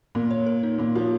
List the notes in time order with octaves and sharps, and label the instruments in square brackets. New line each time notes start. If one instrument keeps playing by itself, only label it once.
[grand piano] A#2 [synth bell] A#3
[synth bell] C#5
A#4
D#4
[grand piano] A#2 [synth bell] A#3
[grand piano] F3 [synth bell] C#5